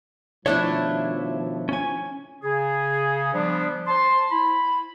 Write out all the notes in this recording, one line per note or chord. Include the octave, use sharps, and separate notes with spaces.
B2 D#3 F3 A3 D4 E4 C#5 E5
C#4 G#5
C#3 G#4
F3 G3 G#3 B3 D4
C5 A5 C6
E4 B5